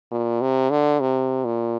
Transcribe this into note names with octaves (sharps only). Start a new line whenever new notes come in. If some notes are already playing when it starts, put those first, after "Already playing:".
A#2
C3
D3
C3
A#2